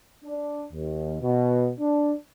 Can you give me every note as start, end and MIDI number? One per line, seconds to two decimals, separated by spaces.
0.25 0.63 62
0.73 1.17 39
1.22 1.71 47
1.80 2.12 62